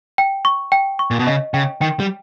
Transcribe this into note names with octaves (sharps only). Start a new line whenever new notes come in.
G5
C#6
G5
C#6
A#2
B2
C#3 D#5
C#3 G5
D#3 G5
G3